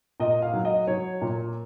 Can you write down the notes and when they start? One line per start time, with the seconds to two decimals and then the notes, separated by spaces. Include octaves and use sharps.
0.20 A#2 D#5
0.42 F5
0.54 F#3
0.65 D#5
0.87 F#3 C#5
1.21 A#2